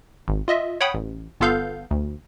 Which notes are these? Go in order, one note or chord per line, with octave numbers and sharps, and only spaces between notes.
G#1
F4 D#5 E5
C#5 F#5 G5 B5 D#6
A1
G1 B3 F4 A4 F5 G6
D2